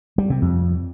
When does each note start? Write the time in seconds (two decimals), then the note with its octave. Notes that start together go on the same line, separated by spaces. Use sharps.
0.18 G3
0.30 C3
0.42 F2